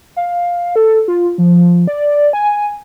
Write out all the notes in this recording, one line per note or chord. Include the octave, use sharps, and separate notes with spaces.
F5
A4
F4
F3
D5
G#5